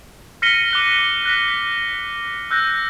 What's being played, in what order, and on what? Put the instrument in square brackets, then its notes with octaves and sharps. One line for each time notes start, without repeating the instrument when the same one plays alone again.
[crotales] F6 A#6 B6 C#7 D#7 G7
D6 F#6 G7
F#6 A#6 B6
B6
E6 F#6 G6 A#6